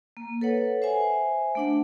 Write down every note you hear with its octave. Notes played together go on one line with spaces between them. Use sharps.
A#3
A4 B4 C#5 F#5
C5 E5 G#5
A3 D4 F#5